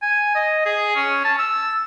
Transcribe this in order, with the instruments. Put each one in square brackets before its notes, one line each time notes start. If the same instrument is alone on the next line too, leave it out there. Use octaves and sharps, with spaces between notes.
[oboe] G#5
D#5
G#4
C#4
A5
E6